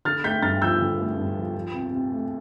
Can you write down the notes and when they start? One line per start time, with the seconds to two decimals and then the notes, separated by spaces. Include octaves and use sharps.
0.05 D3 F6 A6
0.24 A3 G6 B6
0.42 G2 F6 A6
0.62 F3 E6 G6
0.80 D3
0.99 A3
1.17 G2
1.37 F3
1.56 F3
1.73 C3
1.92 C3
2.11 A3